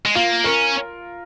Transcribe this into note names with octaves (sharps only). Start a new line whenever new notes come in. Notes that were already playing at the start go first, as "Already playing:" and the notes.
G#3
A#3 F4
C#4 A#4